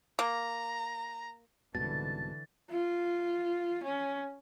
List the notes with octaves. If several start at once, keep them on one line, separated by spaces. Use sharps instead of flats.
A#3 A#5
C2 G#2 B2 D3 E3 A5 A6
F4
C#4